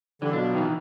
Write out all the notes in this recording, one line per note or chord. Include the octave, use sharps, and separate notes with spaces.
D3 E3 G3 D4
B2 F#3 B3 D4 F4
D#3 E3